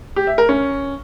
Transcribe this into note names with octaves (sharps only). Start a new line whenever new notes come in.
G4
E5
A#4
C#4